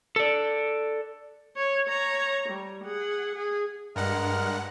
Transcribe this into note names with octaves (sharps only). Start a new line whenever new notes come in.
A4 D5
C#5
C#5 A#5
G3
G#4 F#5
G#4
G2 G#3 A#4 F#5 F6